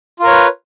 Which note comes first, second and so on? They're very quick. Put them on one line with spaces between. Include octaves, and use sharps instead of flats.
F4 A#4 C#5 B4